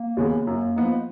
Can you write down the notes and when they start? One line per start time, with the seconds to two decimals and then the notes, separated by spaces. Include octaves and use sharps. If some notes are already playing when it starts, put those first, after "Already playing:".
Already playing: A#3
0.17 D#2 C#3 G#3 B3
0.47 F#2
0.76 F3 B3 D#4